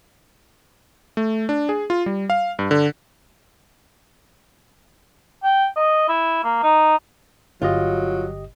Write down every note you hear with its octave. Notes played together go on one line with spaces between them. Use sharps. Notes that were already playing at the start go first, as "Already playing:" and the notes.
A3
D4
G#4
F4
G3
F5
G2
D3
G5
D#5
E4
A#3
D#4
G1 F#3 F4 G4 D#5